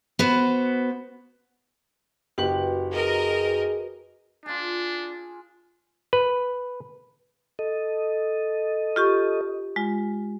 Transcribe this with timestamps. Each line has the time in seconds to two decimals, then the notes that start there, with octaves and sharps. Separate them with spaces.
0.19 B3 F#4 B4 C5
2.38 F#1 F#4 G4 B4 F#7
2.93 G#4 A#4 D#5
4.46 D4 F4 G#4
6.13 B4
7.59 A4 D#5
8.96 F4 G4 C#6
9.76 G#3 F4